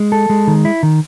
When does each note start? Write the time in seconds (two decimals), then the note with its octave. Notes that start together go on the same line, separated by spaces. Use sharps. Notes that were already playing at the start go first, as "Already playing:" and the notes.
Already playing: G#3
0.12 A4
0.30 G#3
0.47 D#3
0.65 E4
0.83 D#3